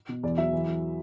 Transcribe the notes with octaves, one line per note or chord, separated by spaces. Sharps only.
B2
E2 D5
F#3 E5
E3
E3